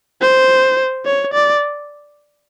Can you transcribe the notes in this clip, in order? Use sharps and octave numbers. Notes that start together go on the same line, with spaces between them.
C5
C#5
D5